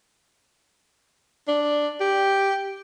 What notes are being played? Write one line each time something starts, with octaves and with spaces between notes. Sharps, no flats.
D4
G4